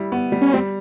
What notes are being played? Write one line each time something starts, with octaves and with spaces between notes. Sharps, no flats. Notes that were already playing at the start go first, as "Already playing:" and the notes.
Already playing: G3 E4
B3
G3
C#4
G3 C4